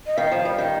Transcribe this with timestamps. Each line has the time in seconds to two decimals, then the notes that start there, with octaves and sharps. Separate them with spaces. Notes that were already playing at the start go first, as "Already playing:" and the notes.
0.06 D#5
0.17 D#3 F5
0.32 F3
0.45 G3
0.58 D#3